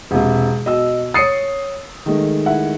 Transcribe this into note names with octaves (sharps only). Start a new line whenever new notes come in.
E1 C3
B2 D#5 E6
C#5 D#6 A6 C7 C#7
D#3 G#3 A3
E4 F#5